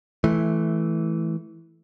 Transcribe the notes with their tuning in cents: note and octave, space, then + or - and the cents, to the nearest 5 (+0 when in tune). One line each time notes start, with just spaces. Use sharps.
E3 -5 A3 -15